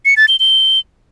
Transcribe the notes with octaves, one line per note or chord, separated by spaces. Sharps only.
C#7
A6
G7
G7